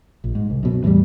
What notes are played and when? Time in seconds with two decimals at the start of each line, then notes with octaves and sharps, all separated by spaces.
0.24 A#1
0.35 G#2
0.50 C2
0.63 F#2 B2
0.84 E2 A2 F#3 G3